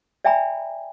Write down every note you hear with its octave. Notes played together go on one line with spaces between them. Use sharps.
D5 E5 G5 G#5 A#5 B5